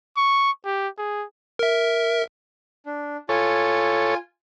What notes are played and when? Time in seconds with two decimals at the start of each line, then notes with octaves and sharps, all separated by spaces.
0.17 C#6
0.65 G4
0.98 G#4
1.59 A#4 E5
2.86 D4
3.29 F4 A4 C#5 G#5